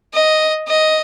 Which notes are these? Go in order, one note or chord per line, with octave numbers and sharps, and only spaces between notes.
D#5
D#5